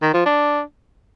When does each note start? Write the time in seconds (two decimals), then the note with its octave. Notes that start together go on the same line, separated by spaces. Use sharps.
0.02 D#3
0.14 F3
0.26 D4